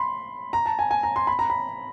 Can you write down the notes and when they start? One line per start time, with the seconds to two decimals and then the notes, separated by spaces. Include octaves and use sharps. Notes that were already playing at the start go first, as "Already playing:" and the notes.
Already playing: B5 C6
0.53 A#5
0.66 A5
0.79 G#5
0.91 G#5
1.03 A#5
1.16 C6
1.27 B5
1.39 A#5
1.50 B5